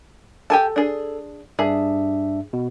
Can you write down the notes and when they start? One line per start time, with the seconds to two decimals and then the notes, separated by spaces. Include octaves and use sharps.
0.50 G4 A4 G#5 A5
0.76 D4 G#4
1.59 G2 D4 G#4 E5
2.53 B2